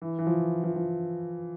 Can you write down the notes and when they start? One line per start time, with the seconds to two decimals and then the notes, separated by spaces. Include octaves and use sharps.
0.02 E3
0.19 E3
0.27 F3
0.64 F3
0.76 F3